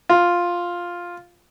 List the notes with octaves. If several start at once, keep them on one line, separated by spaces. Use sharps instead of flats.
F4